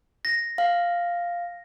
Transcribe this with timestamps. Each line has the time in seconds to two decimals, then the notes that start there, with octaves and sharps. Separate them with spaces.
0.25 A#6
0.58 F5